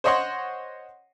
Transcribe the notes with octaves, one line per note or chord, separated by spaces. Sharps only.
C5 C#5 D#5 F#5 C6 C#6